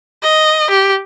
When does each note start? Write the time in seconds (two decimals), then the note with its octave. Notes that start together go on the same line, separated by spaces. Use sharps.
0.23 D#5
0.70 G4